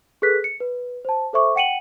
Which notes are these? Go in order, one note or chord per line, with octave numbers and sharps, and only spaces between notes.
G#4 A4 B4 F#6 B6
C#7
B4
C5 A5
A4 C5 E5 C#6 D6
F#5 G5 C#7 D#7 F#7